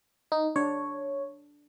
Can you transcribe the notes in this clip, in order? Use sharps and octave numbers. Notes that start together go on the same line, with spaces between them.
D#4
D4 C#5